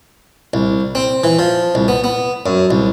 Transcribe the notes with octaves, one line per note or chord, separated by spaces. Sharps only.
C2
C4
E3
F3
C2
B3
B3
F#2
C2